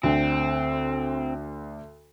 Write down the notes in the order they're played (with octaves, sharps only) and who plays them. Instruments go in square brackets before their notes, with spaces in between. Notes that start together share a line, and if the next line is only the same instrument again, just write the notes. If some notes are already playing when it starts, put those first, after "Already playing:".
[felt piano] D2 D3 [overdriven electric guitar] C4